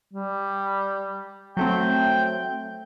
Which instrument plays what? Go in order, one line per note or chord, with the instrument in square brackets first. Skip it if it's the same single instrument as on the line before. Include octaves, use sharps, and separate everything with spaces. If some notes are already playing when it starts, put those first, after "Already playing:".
[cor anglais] G3
[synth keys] F#3 A3 C4 [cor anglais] G5